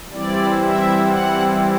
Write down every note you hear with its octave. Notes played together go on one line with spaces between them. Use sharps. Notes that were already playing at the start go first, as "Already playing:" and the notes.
E3 G3 C4 E4 D5
E5
F#5